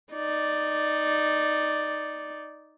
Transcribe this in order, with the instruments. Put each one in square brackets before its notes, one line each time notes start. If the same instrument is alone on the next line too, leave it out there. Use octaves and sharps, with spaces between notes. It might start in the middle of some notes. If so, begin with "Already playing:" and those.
[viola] D#4 D5